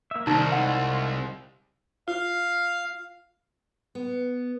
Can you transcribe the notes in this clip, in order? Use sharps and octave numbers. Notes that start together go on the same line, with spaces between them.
A#3 E5
C2 D#3 D#4 A#4
G#3 E4 F4 F#5
F4 F5
B3